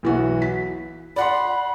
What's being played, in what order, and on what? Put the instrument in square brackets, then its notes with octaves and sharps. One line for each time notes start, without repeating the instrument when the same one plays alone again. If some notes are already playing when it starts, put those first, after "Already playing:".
[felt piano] B1 E3 F#4
B6
[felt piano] D5 F#5 C6 [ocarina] B5